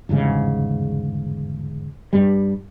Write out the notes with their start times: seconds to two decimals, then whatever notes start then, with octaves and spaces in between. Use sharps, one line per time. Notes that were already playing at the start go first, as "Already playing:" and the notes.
0.09 G1 E2 G#2 C#3
2.13 G2 G3